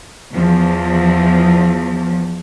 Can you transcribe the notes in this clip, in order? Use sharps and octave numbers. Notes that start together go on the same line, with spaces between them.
E2 F3